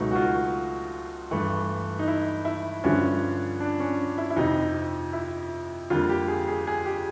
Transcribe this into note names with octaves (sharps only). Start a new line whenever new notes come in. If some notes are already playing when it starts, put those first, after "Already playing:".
Already playing: C#2 B2 F#3 A3 D#4
F#4
F4
G2 E3 A3
D#4
E4
E4
G2 D3 F3 C#4
D4
C#4
E4
E4
F2 C3 F3 D#4
E4
F2 D3 G3 A#3 F4
G4
G#4
G#4
G#4
G4